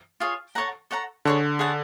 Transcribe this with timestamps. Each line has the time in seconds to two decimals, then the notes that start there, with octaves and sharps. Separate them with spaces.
0.20 F4 G#4 C#5 F5
0.55 A4 C#5 F#5 A#5
0.91 A4 C#5 F#5 A#5
1.25 D3 G#4 C#5 F#5 A5
1.59 G#4 C#5 F#5 A5